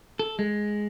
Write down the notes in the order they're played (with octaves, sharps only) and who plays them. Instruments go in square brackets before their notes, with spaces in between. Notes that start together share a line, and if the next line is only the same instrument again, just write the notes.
[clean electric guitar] A4
G#3